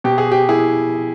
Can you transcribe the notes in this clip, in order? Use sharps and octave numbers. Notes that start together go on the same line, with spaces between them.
B2 G4
G#4
G4
E4 G#4